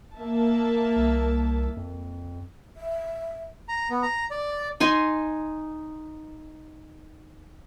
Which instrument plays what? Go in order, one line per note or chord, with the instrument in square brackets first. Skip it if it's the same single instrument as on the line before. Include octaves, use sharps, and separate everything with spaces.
[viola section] A#3 E5 A5
[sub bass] C2
F2
[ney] E5
[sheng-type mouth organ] A#5
B3
A#5
D5
[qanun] D#4 G#5 C6